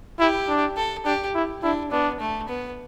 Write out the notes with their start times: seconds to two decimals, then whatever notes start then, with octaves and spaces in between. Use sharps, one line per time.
0.19 E4 G4
0.49 D4
0.77 A4
1.05 D4 G4
1.35 E4
1.62 D4 E4
1.91 B3 D4
2.20 A3
2.49 B3